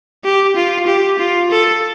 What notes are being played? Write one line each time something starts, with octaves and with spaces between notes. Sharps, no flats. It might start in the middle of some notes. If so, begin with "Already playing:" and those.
G4
F4
G4
F4
A4